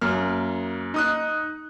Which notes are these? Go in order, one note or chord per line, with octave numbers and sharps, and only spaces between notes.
F#2 A#3 F6
D#4 D#6 F#6